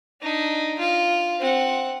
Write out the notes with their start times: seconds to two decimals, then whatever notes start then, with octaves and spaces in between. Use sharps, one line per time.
0.22 D4 D#4
0.79 F4
1.40 C4 F#5